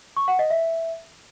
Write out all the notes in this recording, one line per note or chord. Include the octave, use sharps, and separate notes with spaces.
C#6
F#5
D#5
E5